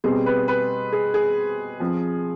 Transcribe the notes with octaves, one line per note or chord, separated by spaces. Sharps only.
B2 G3 C4 G#4
B4
B4
G#4
G#4
F3 C4